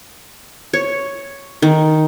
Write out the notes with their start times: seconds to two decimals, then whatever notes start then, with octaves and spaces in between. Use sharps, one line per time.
0.73 C#5
1.62 D#3